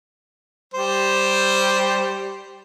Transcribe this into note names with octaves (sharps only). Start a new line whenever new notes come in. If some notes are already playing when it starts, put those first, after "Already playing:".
G3 C5